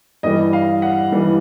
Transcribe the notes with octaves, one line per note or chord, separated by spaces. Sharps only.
G2 E3 G3 D#5
F5
F#5
G2 E3 G3